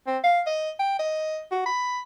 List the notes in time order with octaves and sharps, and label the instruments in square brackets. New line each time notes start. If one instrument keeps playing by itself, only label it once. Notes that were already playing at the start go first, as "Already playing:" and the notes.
[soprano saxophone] C4
F5
D#5
G5
D#5
F#4
B5